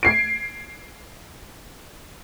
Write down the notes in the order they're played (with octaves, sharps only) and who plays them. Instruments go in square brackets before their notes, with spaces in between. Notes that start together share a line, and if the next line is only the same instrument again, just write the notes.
[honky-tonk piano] G#6 C7 D7